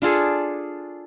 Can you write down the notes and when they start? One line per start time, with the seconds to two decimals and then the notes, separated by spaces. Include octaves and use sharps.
0.02 D4 F4 G#4 A4